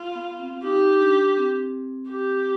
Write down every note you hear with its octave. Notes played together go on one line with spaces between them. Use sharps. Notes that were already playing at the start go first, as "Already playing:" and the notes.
Already playing: F4
B3
C4
D#4 G4
D4
C4
G4